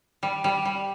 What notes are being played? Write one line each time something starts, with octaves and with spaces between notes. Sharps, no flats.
G3
G3
G3